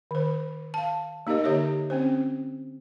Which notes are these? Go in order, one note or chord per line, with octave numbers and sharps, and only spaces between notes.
D#3 C5
F5 A5
A#3 D#4 G4 A#4 D#5
D3 G4 C#5 D#5 E5
C4 C#4 C5